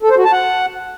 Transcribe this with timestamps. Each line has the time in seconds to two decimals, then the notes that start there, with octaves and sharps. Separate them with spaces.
0.03 A4
0.10 C5
0.17 F#4
0.25 A5
0.32 F#5